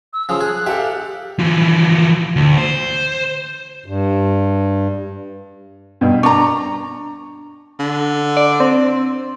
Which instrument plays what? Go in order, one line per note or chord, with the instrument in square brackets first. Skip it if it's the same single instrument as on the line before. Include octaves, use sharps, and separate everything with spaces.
[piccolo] E6
[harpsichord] C#3 F3 [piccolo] D#6
[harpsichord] G#4 [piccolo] F#6
[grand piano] G4 A4 F5 [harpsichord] E5
[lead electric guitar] E3 F3
D2
C5
[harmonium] G2
[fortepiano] G2 B2
[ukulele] D4 A#5 [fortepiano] C#6
[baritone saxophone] D3
[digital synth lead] D5
C4